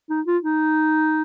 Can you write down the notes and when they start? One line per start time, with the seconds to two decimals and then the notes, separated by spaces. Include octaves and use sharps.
0.10 D#4
0.26 F4
0.43 D#4